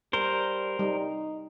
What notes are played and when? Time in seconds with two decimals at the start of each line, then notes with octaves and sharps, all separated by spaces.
0.13 G3 A#4 C5
0.79 G3 D#4